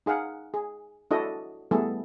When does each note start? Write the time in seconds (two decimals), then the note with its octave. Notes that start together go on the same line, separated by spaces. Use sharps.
0.06 D#4 G#4 F5 F#5
0.54 G#4
1.11 D4 E4 F#4 A4 D#5
1.71 G3 A3 B3 E4 G#4 A4